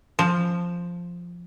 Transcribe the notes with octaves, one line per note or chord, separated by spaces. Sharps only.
F3